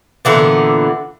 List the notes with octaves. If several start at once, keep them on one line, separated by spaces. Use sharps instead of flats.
A#2 D3 E3 B3